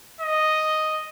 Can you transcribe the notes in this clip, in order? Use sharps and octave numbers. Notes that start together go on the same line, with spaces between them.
D#5